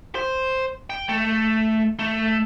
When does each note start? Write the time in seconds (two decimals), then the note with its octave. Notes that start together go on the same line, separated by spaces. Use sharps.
0.15 C5
0.90 G5
1.09 A3
1.99 A3